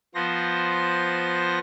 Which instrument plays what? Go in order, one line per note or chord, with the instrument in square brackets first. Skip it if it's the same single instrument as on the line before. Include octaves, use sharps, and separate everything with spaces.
[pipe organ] F3 B3 C5 A#6